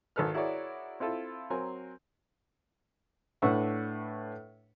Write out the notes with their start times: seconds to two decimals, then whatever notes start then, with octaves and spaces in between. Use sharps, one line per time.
0.16 G#1 D#3 A4 B4 F6
0.34 E4 F#4 G#4 A#4 C#5 D5
1.00 C4 E4 F4 A4
1.50 F#3 C4 A#4 G#5
3.42 A2 D4 B4 F#5 C#6 E6